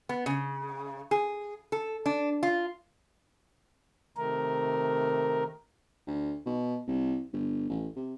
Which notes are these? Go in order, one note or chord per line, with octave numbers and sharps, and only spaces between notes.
B3
C#3
G#4
A4
D4
F4
C3 D#3 A3 A#4
D2
B2
C2
G1
A1
C3